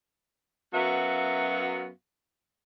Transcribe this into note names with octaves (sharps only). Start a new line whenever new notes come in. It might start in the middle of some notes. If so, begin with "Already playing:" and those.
F#2 F#3 B3 F#4 E5 F5